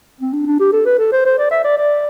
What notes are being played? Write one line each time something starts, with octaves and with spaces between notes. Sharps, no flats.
C4
D4
D4
G4
A4
B4
A4
C5
C5
D5
E5
D5
D5